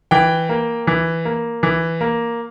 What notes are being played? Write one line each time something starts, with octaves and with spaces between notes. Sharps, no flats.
E3 G5
A#3
E3
A#3
E3
A#3